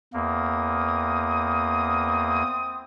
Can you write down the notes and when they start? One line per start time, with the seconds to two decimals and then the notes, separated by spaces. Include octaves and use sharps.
0.14 E2 A#3 C4 D#6